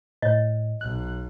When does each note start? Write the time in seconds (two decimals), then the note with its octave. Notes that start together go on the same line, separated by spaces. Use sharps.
0.22 A2 C#5 D#5
0.81 B1 F#6